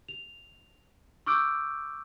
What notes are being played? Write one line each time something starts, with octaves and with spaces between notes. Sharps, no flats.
F7
C#6 D6 E6 F6 G6 D7